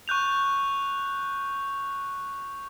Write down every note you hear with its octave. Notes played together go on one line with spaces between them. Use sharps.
C#6 F#6 G6 F7